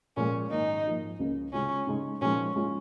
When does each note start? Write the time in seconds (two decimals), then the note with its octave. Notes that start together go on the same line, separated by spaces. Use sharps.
0.17 A#2 F3 G#3 C#4
0.51 G#2 D#3 A#3 D#4
0.86 G#2 F3 A#3
1.19 C#2 C#3 A#3 C#4
1.53 C#3 G#3 C#4 F4
1.87 C#3 G#3 D#4
2.21 A#2 F3 G#3 C#4 D#4
2.56 G#3 C#4 F4